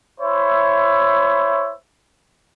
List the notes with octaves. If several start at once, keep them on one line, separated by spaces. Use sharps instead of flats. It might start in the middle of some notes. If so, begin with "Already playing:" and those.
E4 C5 C#5 E5